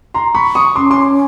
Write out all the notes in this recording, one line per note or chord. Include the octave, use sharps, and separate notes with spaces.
A#5 C6
B5 C#6
C#6 D#6
C#4 C6 D6
C6 D6